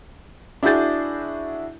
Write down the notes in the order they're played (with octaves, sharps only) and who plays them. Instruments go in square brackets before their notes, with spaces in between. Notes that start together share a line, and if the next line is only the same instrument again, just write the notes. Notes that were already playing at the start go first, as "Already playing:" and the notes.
[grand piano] D4 E4 F#4 G#4 G6 A6